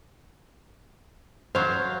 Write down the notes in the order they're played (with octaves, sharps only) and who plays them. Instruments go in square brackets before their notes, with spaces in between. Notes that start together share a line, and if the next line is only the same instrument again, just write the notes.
[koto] F#3 F5 [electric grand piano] C5